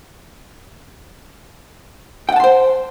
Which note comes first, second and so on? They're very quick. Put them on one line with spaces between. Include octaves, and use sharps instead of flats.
G5 F#5 A5 C6 C5